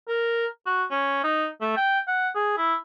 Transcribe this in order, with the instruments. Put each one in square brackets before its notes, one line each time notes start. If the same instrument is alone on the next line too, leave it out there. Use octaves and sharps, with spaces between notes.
[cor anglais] A#4
F#4
C#4
D#4
A3
G5
F#5
G#4
E4